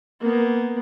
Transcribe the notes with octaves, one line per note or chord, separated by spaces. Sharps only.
A#3 B3